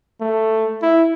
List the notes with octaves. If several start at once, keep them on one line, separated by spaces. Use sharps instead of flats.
A3
E4